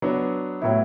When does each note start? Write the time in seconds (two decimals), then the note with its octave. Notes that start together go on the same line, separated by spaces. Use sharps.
0.02 F#3 B3 D4
0.62 A2 F#3 B3 E4